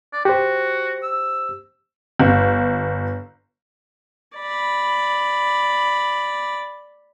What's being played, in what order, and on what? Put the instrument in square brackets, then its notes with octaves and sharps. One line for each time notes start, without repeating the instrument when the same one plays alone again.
[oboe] D5
[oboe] F#4 [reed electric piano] G4 C5
[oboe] E6
[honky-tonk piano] G1
[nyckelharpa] D5 B5